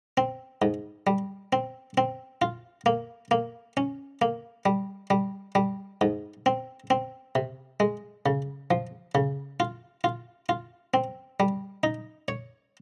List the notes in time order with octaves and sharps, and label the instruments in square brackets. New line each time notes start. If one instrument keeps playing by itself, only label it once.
[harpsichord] C4
G#2
G3
C4
C4
F4
A#3
A#3
C#4
A#3
G3
G3
G3
G#2
C4
C4
C3
G#3
C#3
F3
C#3
F4
F4
F4
C4
G3
D#4
C#5